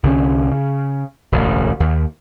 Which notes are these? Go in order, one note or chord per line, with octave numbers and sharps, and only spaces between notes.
C2 D3 D#3 C#4
C#3
E1 A1 D2
D#2